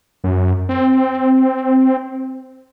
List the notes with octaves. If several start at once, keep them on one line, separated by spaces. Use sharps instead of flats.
F#2
C4